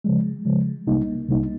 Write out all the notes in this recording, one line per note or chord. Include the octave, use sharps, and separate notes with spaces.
C#3 F3 G#3
C#3 F3 G#3
C2 C3 G3 A#3 D#4
C2 C3 G3 A#3 D#4